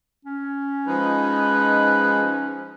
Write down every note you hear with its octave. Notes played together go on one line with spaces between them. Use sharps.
C#4
F3 G#3 D#4 B4